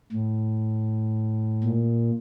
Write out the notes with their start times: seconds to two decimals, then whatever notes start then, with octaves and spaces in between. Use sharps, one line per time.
0.12 A2
1.64 A#2